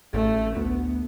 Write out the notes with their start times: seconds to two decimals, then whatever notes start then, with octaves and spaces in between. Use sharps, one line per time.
0.14 A1 A3
0.56 D2 B3